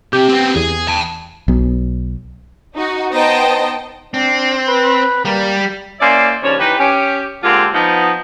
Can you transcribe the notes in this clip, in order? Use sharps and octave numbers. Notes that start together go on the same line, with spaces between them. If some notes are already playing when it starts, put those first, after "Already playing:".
C3 G4
B3 C4
E2 G#4
G5 A5
B1 B2
D#4 F#4
B3 D#4 C5 D#5 G5 A5
C4 D4
B4
G3 A#3
A#3 C#4 E4 C5 D5
D#2 C#3 F3 D4 C#5
E3 D#4 G4 B4
C#4 G4
D3 G#3 A#3 C4 F4 G4
F3 B3 D#4